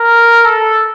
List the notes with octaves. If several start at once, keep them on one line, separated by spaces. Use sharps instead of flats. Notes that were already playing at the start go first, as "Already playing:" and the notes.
Already playing: A#4
A4